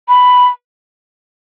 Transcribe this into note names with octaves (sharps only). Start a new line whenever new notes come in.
B5